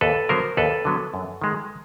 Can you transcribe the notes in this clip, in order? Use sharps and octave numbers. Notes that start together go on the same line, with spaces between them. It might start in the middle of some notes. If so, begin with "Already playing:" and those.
D#2 A4 B4
D3 F#3 B3 A#4 C5
D#2 A4 B4
D3 F#3 B3
F#2
D#3 G#3